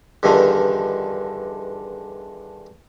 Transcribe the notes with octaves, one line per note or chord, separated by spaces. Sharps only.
E2 G2 D3 D#3 F3